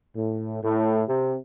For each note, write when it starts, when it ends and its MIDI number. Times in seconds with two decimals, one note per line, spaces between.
0.15 0.59 45
0.63 1.02 45
1.09 1.37 48